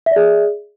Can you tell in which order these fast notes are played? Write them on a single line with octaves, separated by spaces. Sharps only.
E5 D5 G#4